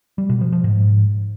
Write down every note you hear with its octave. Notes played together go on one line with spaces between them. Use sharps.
G3
B2
F3
F3
G#2